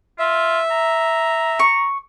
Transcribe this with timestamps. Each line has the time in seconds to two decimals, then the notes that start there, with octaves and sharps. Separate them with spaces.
0.19 F4 E5
0.71 A#5
1.59 C#6